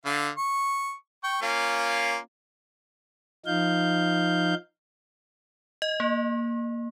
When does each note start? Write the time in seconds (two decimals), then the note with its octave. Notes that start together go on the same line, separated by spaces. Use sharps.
0.05 D3 F5
0.37 C#6
1.24 G5 C#6
1.42 A#3 C#4 F4
3.46 F3 D#4 F5 G6
5.82 D#5
6.00 A#3